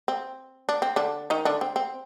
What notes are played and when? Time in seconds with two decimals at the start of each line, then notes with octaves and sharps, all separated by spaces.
0.08 C4
0.69 D4
0.82 C4
0.96 D3 D4
1.30 D#3 D#4
1.45 D3 D4
1.61 C4
1.76 C4